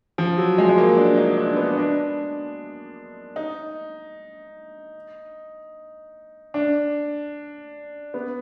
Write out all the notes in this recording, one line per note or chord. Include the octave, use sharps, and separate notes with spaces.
F3
F#3
G#3
G#3
A#3
D4
D#4
D4
B3
D4
D#4
D4
B3